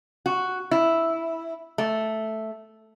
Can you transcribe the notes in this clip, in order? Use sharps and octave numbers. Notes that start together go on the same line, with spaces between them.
F#4
E4
A3